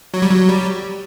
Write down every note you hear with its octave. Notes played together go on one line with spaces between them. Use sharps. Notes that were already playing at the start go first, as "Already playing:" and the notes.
F#3
G3
F#3
G3